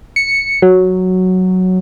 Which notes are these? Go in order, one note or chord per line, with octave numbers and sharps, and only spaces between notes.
C#7
F#3